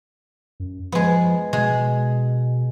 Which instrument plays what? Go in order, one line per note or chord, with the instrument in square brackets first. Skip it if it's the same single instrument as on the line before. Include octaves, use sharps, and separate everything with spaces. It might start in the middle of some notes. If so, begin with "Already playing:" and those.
[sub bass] F#2
[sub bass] F3 [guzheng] G#3 B3
[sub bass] B2 [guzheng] G#3